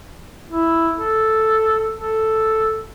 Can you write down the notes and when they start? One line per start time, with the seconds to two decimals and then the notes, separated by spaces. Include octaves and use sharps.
0.49 E4
0.95 A4
1.94 A4